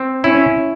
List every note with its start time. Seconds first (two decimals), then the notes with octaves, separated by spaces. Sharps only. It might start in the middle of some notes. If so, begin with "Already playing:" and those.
Already playing: C4
0.24 C#4 E4